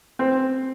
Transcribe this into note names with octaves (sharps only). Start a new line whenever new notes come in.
C4